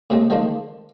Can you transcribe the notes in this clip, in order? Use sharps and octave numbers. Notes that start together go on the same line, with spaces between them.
A2 C3 G#3 A3
D3 D#3 F3 G#3 A3 D4